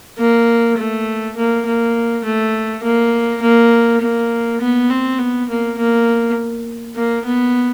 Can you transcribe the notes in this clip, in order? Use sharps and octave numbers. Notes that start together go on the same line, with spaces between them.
A#3
A3
A#3
A#3
A3
A#3
A#3
A#3
B3
C4
B3
A#3
A#3
A#3
B3